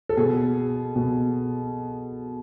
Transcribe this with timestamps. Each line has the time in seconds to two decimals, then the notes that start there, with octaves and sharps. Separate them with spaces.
0.09 A4
0.17 B2 G#4
0.96 B2